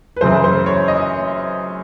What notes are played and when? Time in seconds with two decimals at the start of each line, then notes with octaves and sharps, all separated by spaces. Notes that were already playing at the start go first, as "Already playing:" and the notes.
0.16 B4
0.21 F#2 C#3 E3 C5
0.44 C5
0.66 C#5
0.88 D#5